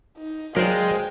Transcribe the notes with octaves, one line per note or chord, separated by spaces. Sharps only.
D#4
F#3 G#3 A#4 C5 D5 F5 G5